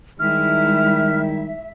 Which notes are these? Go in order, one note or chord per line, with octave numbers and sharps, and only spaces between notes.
D#3 G3 G#3 D#4 E4 E5 F6